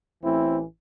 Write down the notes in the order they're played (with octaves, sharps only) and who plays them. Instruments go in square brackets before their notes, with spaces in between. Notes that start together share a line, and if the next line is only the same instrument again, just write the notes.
[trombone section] A1 A2 E3 C4 E4